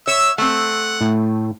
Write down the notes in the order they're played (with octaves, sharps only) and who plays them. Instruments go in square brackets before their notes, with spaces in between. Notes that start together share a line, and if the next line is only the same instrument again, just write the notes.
[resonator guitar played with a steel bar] C#5 [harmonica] E5 E6
[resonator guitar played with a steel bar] A3 C4 [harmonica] F#5
[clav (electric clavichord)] A2